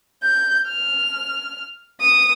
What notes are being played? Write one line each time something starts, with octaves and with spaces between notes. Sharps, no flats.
G6
F6
D#6